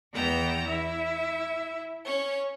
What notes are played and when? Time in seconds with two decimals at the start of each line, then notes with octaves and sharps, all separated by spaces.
0.12 E2 E3 B3 G5 A#5 E6
0.68 E4 E5
2.05 C#4 C#5